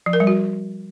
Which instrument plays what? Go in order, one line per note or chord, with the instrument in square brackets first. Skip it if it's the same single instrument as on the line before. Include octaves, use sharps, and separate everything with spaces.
[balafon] F3
A#4
G3
F#4